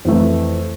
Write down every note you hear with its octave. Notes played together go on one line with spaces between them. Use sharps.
F2 E3 A3